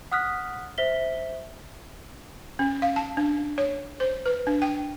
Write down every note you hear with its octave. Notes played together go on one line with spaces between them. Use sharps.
F#5 D#6 F6 F#6 B6
C5 E5 B6 G7
C#4
F5
A5
D4
C#5
C5
B4
D4
G5